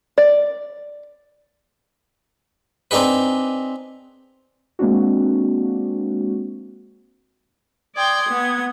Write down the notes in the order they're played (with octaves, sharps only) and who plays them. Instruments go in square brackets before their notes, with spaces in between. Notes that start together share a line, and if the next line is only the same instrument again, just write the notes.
[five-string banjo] D5
[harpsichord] C4 D4 D#4 G#4 B4
[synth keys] G#3 A#3 C4 D4 F#4
[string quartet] D5 G5 C6 [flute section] D#6 G#6
[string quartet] B3